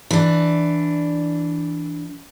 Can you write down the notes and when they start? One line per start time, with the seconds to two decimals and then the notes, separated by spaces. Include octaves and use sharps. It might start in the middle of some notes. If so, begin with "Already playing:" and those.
0.11 E3 D4